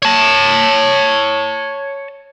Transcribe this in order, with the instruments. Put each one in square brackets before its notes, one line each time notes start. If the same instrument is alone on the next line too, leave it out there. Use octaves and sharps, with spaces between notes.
[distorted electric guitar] C#5 A5